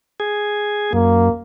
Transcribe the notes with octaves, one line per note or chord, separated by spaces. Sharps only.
G#4
F#2 A#3